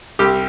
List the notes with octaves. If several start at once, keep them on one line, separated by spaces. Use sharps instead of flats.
C2 G4